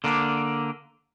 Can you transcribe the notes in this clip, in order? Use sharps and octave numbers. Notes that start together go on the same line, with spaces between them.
D3 A#3 D4